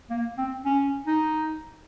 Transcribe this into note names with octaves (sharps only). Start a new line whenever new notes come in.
A#3
C4
C#4
D#4